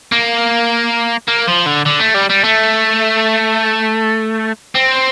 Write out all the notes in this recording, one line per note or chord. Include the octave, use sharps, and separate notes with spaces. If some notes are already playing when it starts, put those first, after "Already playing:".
A#3
A#3
F3
D3
D3
A3
G3
G3
A3
C4